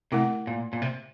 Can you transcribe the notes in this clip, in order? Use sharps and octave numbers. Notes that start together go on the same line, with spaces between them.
C3 A3 E4 A#4
A#2
A#2
C3